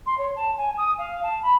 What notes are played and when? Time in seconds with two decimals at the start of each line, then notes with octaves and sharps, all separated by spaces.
0.06 C6
0.17 C#5
0.36 A5
0.57 G#5
0.77 D#6
0.98 F5
1.23 A5
1.42 B5